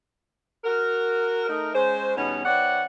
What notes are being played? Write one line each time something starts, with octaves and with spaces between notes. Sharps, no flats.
F#4 A#4
A3 D#4 A#4
G#3 C#4 C5
E2 B2 G3 B3 C#4 D#4
E3 C4 C#5 D5 F#5